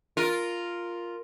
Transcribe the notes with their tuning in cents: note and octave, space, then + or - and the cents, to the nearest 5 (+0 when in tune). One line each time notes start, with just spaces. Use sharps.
F4 +0 A#4 +0